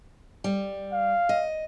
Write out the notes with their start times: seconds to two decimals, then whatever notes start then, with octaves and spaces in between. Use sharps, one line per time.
0.44 G3
0.93 F5
1.29 D#5